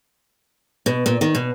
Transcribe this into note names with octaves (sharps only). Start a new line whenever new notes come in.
B2
A#2
D#3
B2